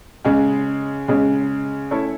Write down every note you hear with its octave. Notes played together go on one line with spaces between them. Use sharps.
C#3 G#3 C#4
C#3 G#3 C#4
A3 C#4 E4 A4 C#5